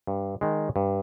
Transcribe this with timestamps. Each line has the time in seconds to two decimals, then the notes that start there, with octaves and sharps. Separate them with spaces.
0.07 G2
0.41 D#3 G#3
0.76 G2